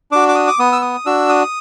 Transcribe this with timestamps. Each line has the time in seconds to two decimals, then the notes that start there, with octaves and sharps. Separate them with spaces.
0.11 D4 F#4 D6
0.28 D6
0.35 D#6
0.47 D6
0.59 B3 D#6
0.72 E6
0.82 D#6
1.06 D4 F#4 E6
1.29 D#6